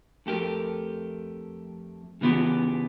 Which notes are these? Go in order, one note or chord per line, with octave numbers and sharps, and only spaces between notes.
F2 A3 G4 A#4
C#3 E3 B3 F4 G4